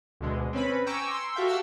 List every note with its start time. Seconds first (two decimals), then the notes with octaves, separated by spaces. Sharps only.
0.21 D2 B2 D3 G#3
0.53 C4 C#4 B4 B5
0.86 G5 G#5 A#5 C#6 D6 E6
1.11 C6 E6
1.36 F#4 A4 E5 F5 G5
1.48 G4 F#5 A5 E6 F6